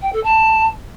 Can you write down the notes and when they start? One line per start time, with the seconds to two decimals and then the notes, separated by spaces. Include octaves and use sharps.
0.01 G5
0.12 A4
0.23 A5